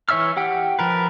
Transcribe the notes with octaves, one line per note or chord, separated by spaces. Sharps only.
E3 C#5 E5 E6 F6
G4 F#5 G5
F3 A#4 B4